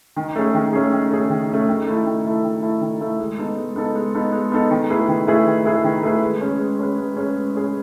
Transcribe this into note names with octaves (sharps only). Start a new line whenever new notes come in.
D#3
A3 C#4 G#4
D#3
A3 C#4 G#4
D#3
A3 C#4 G#4
D#3
A3 C#4 G#4
D#3
A3 E4 A4
D#3
A3 E4 A4
D#3
A3 E4 A4
D#3
A3 E4 A4
G#3
B3 D#4 A4
G#3
B3 D#4 A4
G#3
B3 D#4 A4
G#3
B3 D#4 A4
D#3
A3 E4 G#4 B4
D#3
A3 E4 G#4 B4
D#3
A3 E4 G#4 B4
D#3
A3 E4 G#4 B4
G#3
C#4 G#4 B4
G#3
C#4 G#4 B4
G#3
C#4 G#4 B4
G#3
C#4 G#4 B4